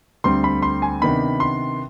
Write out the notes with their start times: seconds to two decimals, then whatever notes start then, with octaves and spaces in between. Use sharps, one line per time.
0.24 D2 D3 G3 C4 C6
0.44 B5
0.62 C6
0.82 G#5
1.02 C3 D#3 B3 D4 B5
1.40 C6